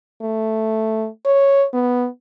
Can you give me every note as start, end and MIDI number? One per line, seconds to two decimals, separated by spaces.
0.22 1.07 57
1.25 1.66 73
1.73 2.07 59